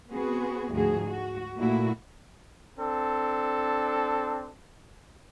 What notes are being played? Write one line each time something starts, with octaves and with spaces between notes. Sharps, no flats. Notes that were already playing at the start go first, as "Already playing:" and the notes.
B3 C4 F#4 G#4
D2 G#2 F3 F#4 G#4
F#4
A#2 A3 A#3 E4 F#4
C4 D4 A4